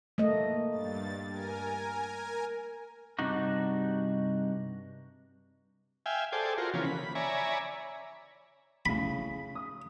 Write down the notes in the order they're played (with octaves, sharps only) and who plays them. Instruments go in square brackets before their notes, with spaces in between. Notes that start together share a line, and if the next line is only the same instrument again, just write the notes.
[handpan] A3 A#3 D#5
[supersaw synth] G2 A6
A#4 G#5
[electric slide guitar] G2 C3 D4 D#4 F#4
[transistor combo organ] E5 F5 G5 G#5
G#4 A4 C5 D5 G5
F4 F#4 A#4 C5
C#3 E3 F3 A#3 C#4
B5
C#5 D5 E5 G#5 A#5 B5
[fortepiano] A2 C#3 [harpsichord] B5
[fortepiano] D#6